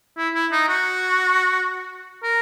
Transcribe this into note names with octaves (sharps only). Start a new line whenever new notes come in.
E4
E4
D#4
F#4
A#4